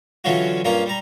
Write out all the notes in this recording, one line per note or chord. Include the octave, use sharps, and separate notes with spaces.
D3 E3 F#3 C#4 F4 F#4
G2 A#3 C#4 F4 A#5
G3 A#5